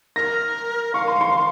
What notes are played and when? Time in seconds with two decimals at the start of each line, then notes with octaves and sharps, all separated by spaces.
0.16 A#4 A#6
0.94 F5 C#6
1.08 C6
1.21 C6